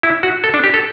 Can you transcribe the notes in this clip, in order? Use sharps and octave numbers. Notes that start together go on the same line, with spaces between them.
E4
F#4
A4
D4
G4
A4